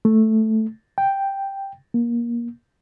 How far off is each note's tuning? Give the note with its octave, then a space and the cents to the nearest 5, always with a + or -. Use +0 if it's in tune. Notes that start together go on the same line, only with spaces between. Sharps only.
A3 +0
G5 +0
A#3 +20